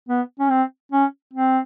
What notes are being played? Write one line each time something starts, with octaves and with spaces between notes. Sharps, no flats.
B3
C#4
C4
C#4
C4